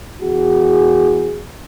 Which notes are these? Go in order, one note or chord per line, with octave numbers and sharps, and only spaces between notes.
E2 F#4 G#4